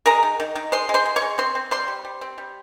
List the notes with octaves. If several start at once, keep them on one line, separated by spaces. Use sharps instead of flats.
G#3 A#4 A#5
D#3
D#3
D#3
G#3 C5 C6
G#3
C5 C6
G#3
C#5 C#6
G#3
C4 C5 C6
C4
G3 C5 C6
G3
G3
C4
G3